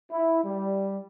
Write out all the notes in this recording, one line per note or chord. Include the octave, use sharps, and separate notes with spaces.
E4
G3